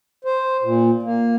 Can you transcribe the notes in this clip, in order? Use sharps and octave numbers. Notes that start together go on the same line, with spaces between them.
C5
A#2
A#3